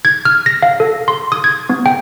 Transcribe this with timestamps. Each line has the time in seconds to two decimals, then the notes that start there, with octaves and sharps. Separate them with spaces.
0.05 G#6
0.25 F6
0.46 A#6
0.62 F5
0.80 A4
1.08 C6
1.32 D#6
1.44 G#6
1.70 B3
1.86 G5